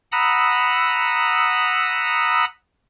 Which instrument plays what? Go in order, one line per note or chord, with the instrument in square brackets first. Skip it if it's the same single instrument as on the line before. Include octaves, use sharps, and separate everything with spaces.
[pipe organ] F#5 A#5 B5 D#6 E6